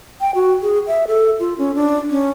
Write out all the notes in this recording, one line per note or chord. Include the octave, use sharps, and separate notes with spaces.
G5
F#4
G#4
E5
A4
F4
C#4
D4
C#4